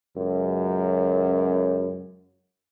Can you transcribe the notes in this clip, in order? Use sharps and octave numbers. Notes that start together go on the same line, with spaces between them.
C#2 F#2